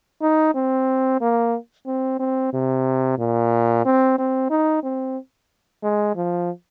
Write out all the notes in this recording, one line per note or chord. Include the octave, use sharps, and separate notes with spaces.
D#4
C4
A#3
C4
C4
C3
A#2
C4
C4
D#4
C4
G#3
F3